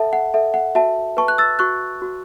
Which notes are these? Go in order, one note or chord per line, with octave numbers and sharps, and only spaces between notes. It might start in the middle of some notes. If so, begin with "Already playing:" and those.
Already playing: A4 E5 F#5 A5
F#5
A4 E5
F#5
F#4 E5 A5
B4 A5 C#6
F#6
E6 A6
F#4 C#6 F#6
F#4